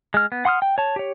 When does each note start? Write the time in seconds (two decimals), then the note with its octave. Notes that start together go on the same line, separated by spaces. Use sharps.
0.14 G#3 F6
0.32 B3
0.45 F#5 C6 D#6 F6
0.62 G5
0.78 C#5 A5
0.96 G4 C#5